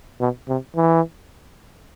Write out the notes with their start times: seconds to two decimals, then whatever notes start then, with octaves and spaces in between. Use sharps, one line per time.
0.20 B2
0.48 C3
0.76 E3